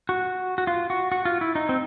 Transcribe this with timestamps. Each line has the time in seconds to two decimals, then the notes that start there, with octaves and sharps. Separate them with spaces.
0.09 F#4
0.58 F#4
0.67 F4
0.90 F#4
1.12 F#4
1.25 F4
1.41 E4
1.55 D#4
1.69 C4